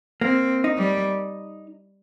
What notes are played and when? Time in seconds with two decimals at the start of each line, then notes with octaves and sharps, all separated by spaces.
0.21 A#3 C4
0.64 D#4
0.78 G3